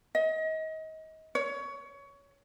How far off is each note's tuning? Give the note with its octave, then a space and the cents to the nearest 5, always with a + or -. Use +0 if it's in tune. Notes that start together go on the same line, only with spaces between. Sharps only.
D#5 +30
C#5 +20